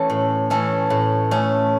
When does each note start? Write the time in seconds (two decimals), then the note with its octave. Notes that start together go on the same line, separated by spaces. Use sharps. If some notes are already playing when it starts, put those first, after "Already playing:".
Already playing: E3 A3 C#4 A4
0.10 A2
0.50 E3 A3 C#4 A4
0.90 A2
1.31 A3 C#4